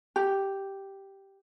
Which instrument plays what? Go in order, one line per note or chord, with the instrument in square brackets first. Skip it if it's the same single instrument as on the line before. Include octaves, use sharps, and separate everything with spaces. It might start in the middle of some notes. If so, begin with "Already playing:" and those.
[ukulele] G4